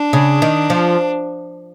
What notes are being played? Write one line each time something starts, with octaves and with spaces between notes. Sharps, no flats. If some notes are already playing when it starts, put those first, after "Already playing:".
Already playing: D4
C#3
D#3
F3